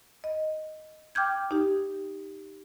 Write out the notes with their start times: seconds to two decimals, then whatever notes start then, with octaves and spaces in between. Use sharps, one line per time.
0.24 D#5
1.15 G5 D6 F6 G6 G#6
1.51 D#4 G4